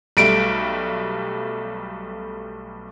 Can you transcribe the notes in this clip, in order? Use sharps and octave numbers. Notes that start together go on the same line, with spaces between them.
B1 G3 A3 D7